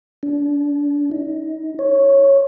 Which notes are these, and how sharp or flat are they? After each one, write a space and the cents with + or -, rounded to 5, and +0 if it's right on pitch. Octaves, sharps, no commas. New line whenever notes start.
D4 -30
D#4 +30
C#5 -5